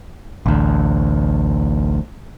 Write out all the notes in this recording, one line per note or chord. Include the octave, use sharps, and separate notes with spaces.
A1 D2